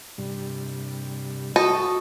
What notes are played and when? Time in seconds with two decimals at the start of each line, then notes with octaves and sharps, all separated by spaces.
0.18 G2 C3 G3
1.56 F#4 A4 D#5